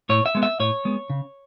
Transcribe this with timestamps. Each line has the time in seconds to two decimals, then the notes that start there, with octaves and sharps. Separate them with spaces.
0.09 A2 C#5
0.26 E5
0.35 G#3 B3
0.43 E5
0.60 A2 C#5
0.85 G#3 B3
1.10 C#3